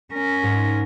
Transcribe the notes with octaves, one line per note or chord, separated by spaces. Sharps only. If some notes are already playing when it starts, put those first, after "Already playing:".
C#4 A#4
G#2